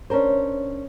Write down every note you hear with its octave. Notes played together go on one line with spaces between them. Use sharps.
C#4 D4 A#4 C5